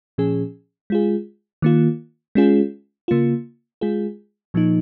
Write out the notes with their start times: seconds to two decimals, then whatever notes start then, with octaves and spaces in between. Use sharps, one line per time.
0.18 A#2 F3 C#4 G#4
0.90 G#3 F4 G#4
1.62 D#3 A#3 F4
2.35 G#3 C#4 F4 G#4
3.08 C#3 A#3 F4
3.81 G#3 F4 G#4
4.54 A#2 F3 A#3 D#4